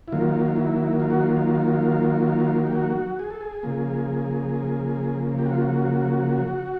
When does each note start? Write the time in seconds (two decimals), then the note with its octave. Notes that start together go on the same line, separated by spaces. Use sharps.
0.08 E4
0.12 D#3 F#3 A#3 F4
0.46 F4
0.56 E4
1.00 F4
1.10 F#4
1.21 F4
2.67 G4
2.75 F#4
3.19 G#4
3.30 A4
3.41 G#4
3.63 C#3 F3 A#3
5.38 G4
5.46 F#4
5.53 F4
5.61 F#4